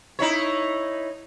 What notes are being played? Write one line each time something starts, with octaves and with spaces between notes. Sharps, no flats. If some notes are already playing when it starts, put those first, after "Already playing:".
D#4 E4 C#5